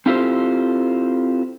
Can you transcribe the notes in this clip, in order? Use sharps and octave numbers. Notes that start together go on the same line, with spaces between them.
C4 E4 F4 G4 A4 C5